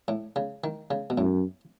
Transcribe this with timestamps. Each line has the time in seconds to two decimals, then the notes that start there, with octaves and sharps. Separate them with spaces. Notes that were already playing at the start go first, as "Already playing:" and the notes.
0.08 A2
0.36 C#3
0.64 D#3
0.91 C#3
1.10 B2
1.18 F#2 A2